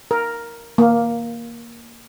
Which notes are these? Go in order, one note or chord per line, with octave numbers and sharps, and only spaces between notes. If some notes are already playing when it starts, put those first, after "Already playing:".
A#4
A#3